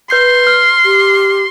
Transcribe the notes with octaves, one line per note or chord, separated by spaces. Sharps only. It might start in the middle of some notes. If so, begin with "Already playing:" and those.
B4 C6 G6 C7
F6
G4